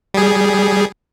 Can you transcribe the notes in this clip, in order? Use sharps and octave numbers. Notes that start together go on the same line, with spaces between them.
G3 G#4